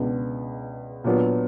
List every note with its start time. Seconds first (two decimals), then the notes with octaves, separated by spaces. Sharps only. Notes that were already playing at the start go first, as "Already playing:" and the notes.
Already playing: C#2 B2 G#3 B3 D4
1.04 A#2 F#3 B3 D4